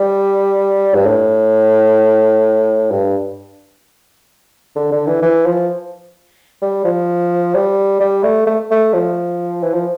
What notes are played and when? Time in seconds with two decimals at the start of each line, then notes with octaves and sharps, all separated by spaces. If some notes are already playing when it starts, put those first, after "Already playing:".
Already playing: G3
0.95 G2
1.06 A2
2.91 G2
4.76 D3
4.92 D3
5.07 E3
5.22 E3
5.46 F3
6.62 G3
6.84 F3
7.55 G3
8.00 G3
8.23 A3
8.47 A3
8.71 A3
8.93 F3
9.63 E3
9.74 F3